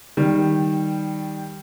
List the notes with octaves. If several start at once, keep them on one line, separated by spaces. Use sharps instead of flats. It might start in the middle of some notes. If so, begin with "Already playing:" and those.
D#3 G3